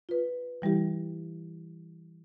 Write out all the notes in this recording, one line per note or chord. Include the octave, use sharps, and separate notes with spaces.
F4 B4
E3 G3 E4 G4